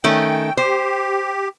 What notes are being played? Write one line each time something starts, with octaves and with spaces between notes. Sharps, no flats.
D#3 A3 C#4 G5
G4 C5